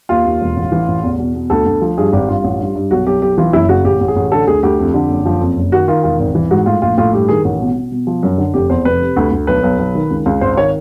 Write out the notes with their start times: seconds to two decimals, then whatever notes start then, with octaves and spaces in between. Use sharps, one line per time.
0.09 D#2 F4
0.25 D#2
0.41 E1
0.56 A1
0.72 E3
0.88 A1
1.03 E2
1.19 B2
1.35 B2
1.50 D2 A4
1.66 D2
1.81 F3
1.98 G2 G#4
2.13 G#1 G4
2.28 G2 F4
2.44 A1
2.59 G2
2.75 G2
2.91 B1 F#4
3.07 B1 G4
3.22 B1 G4
3.38 E3 F4
3.53 F#1 E4
3.69 C#3 F#4
3.84 A1 G4
4.01 A1
4.08 G#4
4.16 A1
4.32 D3 A4
4.47 D2 G#4
4.63 D2 G4
4.79 F2
4.94 D3
5.10 F#1
5.25 F3
5.41 F2
5.57 F#1
5.72 D#3 F#4
5.88 D#3 F4
6.04 E1 F4
6.20 G#1
6.35 E3
6.51 G#2 F#4
6.66 A2 F4
6.82 A#1 F4
6.98 A2 F4
7.13 G2 G4
7.28 D#3 G#4
7.45 A1
7.60 B2
7.76 B2
7.92 B2
8.07 F3
8.23 F#2
8.38 D3
8.54 F1 G4
8.70 E2 C5
8.85 F1 B4
9.01 C3
9.16 D2
9.32 D2
9.47 B1 B4
9.63 B1
9.79 B1
9.95 D#3
10.10 C#2
10.26 C#2
10.41 G#1 C5
10.57 D#3 C#5